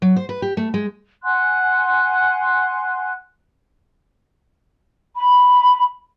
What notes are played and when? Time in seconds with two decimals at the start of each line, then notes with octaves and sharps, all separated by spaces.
0.02 F#3
0.16 C5
0.29 B4
0.42 G4
0.57 A3
0.74 G#3
1.24 F#5 G#5 C6 F#6
5.17 B5